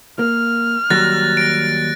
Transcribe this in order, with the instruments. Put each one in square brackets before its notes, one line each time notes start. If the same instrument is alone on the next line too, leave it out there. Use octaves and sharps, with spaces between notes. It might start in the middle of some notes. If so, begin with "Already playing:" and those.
[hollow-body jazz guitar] A#3 [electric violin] F6
[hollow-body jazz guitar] D#2 F#3 G3 [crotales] F#6 A6 A#6
[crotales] A#6 D7